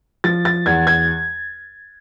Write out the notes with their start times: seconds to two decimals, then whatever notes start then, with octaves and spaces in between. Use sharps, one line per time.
0.24 F3 A6
0.45 A6
0.66 E2 G#6
0.87 G#6